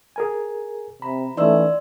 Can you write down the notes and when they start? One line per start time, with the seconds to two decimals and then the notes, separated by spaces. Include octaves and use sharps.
0.16 G#4 A#4 G#5
1.02 C3 A#5 B5
1.37 E3 A3 C#4 D#4 D5 C6 E6